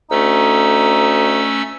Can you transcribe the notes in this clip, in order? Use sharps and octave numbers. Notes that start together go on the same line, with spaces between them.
D2 A3 C#4 D#4 E6